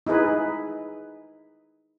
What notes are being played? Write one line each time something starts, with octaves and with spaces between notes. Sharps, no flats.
D#4 E4 G#4 B4